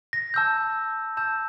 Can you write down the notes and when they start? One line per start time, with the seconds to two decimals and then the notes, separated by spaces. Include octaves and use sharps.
0.13 A#6
0.34 A5 E6 G6
1.17 A5 E6 G6